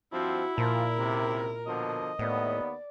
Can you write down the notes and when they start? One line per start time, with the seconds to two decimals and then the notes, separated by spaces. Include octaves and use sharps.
0.12 G2 F3 C4 E4 F#4
0.58 A#2 F3 A#4
0.98 C#2 C3
1.67 B2 D3 F3 D#5
2.19 D#2 A2 B3 D5